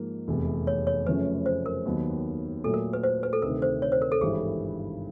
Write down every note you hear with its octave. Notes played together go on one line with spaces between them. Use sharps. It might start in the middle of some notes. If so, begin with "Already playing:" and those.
Already playing: G#2 F3 A#3
F1 E2 C3
C#5
C#5
F#2 C#3 F3 A3 C#4 B4
C5
A#4
D#2 D#3 F#3 B3
A#2 F#3 A3 A4
A#4
B4
C5
B4
A4
D2 C3 D#3 A#4
C5
C#5
C5
A#4
A4
G#1 G2 E3 G3 G#4